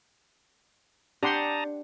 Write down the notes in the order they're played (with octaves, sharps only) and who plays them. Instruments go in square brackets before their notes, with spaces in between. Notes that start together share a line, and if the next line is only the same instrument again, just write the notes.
[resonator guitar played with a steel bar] D4 [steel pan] G4 F#5 C6 [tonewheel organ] A5 A#5 D#6